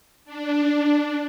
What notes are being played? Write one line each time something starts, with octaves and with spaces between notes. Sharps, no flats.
D4